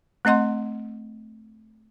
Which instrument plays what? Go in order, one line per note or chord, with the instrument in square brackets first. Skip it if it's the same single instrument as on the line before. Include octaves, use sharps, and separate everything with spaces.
[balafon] A3 C4 D#5 F#5 C6